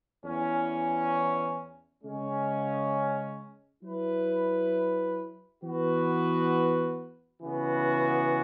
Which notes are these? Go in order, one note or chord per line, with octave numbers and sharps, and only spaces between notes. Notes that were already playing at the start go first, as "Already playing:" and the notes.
E2 E3 C#4
C#3 G#3 C#4
F#3 E4 B4
E3 B3 F#4 B4
C#3 E3 B3 F#4